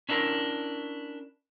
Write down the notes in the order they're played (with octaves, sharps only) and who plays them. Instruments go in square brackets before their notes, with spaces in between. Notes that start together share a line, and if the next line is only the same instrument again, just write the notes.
[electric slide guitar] C#4 D4 E4 A#4